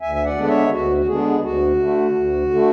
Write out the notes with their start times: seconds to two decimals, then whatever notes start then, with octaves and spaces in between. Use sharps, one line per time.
0.01 D2 E5 G#5
0.15 E5
0.24 D5 F#5
0.37 D3 G#3 B3 D4
0.44 F#5
0.49 C#5 E5
0.72 D2 F#4
0.97 F#4
1.08 D3 G#3 B3 D4 G#4
1.44 D2 F#4
1.79 D3 A3
2.15 D2
2.51 D3 A3